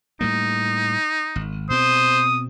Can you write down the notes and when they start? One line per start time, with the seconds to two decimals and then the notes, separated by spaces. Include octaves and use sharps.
0.21 A2 G3 A#3 D#4
1.36 G#1
1.70 B2 C4 C5 D#6